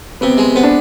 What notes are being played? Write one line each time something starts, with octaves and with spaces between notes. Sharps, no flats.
C3 B3
G#3
B3 C4
D4